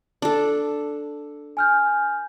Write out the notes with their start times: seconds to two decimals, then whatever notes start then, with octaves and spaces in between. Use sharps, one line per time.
0.22 D4 A4
1.57 G#5 F6 G6